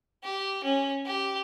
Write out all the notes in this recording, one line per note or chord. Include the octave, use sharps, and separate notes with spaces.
G4
C#4
G4